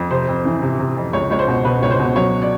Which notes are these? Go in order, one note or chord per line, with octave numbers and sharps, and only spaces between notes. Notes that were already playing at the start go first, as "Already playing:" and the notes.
Already playing: F2
C3 C5
F2
E3
C3
C3
F2
C#2 C#5
C#2 C#5
C5
B2
B2 B4
C#2 C#5
C5
B2
F#3 C#5
D5